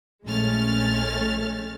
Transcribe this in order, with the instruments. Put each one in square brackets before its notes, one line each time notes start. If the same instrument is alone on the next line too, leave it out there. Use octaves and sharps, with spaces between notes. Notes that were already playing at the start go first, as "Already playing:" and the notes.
[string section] A#1 G#3 A3 C#4 F6 A6